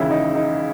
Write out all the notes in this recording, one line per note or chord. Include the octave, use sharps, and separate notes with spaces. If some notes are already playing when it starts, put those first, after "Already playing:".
Already playing: E1 D#2 C#3 E4
D#4
D#4